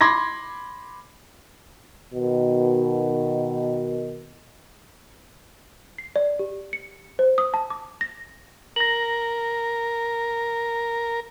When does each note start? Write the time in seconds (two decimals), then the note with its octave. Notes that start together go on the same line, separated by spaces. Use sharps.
0.01 B5 C6 D6 G#6 A#6
2.14 B2 D#3
5.98 C7
6.16 D5
6.39 G4
6.73 C#7
7.19 C5
7.38 D#6
7.54 A5
7.70 D6
8.01 A#6
8.76 A#4 A#6 F#7